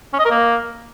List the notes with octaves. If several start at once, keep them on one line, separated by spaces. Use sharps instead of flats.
C#4
D#5
A#4
A#3